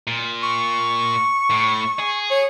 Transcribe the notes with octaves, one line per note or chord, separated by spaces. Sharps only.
A#2
C#6
A2
G#4
C#5